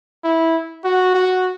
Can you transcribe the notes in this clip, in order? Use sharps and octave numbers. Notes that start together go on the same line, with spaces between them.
E4
F#4
F#4